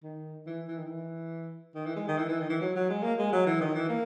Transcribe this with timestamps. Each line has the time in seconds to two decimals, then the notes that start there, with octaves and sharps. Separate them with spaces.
0.04 D#3
0.47 E3
0.68 E3
0.78 D#3
0.87 E3
1.75 D#3
1.86 E3
1.96 G#3
2.08 D#3
2.18 E3
2.29 E3
2.40 D#3
2.50 E3
2.61 F#3
2.76 F#3
2.90 G#3
3.03 A#3
3.19 G#3
3.32 F#3
3.47 E3
3.61 D#3
3.75 E3
3.89 A#3